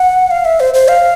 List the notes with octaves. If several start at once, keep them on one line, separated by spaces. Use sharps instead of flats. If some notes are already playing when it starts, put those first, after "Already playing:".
Already playing: F#5
F5
E5
C5
C5
F5